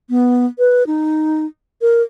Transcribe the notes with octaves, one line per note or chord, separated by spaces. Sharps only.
B3
B4
D#4
A#4